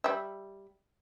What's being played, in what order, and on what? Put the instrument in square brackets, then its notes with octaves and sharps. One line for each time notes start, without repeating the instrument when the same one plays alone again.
[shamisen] G3 E5